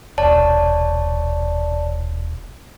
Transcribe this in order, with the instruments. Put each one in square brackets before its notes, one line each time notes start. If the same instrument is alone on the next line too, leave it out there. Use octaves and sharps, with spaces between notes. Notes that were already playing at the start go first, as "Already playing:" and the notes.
[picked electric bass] D#1 B1 [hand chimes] C#5 D5 A5